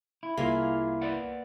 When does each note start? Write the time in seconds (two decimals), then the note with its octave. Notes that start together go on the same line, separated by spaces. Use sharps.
0.23 E4
0.38 C2 A#3 E4 F4 G#4 C6
1.02 B4 D5 F#5